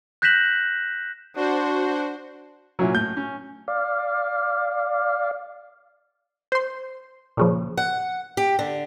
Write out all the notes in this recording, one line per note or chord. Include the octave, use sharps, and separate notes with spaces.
F#6 G6 A#6 B6 E7 F#7
D4 F#4 C5
A#2 F#3 A#3 C#4 E4
A2 G6
C#4
D5 F5
C5 C6
A#2 C#3 F3
F#5
G4
D3